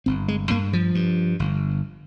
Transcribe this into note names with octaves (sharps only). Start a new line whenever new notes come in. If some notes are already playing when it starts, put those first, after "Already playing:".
G1 C4
G#3
G2 A#3
F3
G2
G1